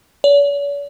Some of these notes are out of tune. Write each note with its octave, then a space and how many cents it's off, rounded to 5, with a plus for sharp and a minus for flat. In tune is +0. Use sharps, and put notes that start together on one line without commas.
C#5 +45